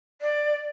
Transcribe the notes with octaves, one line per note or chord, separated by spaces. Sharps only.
D5